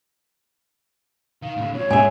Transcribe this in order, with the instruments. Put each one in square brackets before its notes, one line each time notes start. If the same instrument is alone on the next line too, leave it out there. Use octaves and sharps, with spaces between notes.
[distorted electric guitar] D#3 [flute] F5
[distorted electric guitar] A2 D3
[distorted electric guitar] F#2 F3 [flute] C#5
[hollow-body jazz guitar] G#2 E5 [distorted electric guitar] G#3 [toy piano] G#5